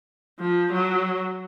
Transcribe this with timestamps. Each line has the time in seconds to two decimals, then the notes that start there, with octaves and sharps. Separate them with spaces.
0.39 F3
0.73 F#3